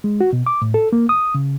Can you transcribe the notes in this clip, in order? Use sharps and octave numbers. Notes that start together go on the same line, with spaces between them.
G#3
F#4
B2
D6
A2
A4
A#3
D#6
C#3